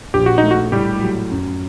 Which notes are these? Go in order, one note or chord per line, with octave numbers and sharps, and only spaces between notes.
A#1 G4
F#4
D#4
A3
F#4
A2 G3 G4
F#3
F#2